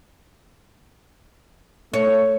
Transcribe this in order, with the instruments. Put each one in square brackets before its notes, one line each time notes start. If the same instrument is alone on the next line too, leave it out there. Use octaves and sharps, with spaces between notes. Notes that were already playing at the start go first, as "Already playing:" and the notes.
[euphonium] A3 [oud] C#5